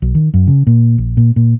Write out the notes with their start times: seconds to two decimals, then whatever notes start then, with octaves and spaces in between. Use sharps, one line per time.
0.02 B1
0.15 D#3
0.34 F#2
0.47 C#3
0.67 A#2
0.98 A#1
1.17 A#2
1.36 A#2